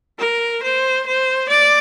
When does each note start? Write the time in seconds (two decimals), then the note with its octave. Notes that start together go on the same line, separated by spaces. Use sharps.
0.19 A#4
0.62 C5
1.06 C5
1.49 D5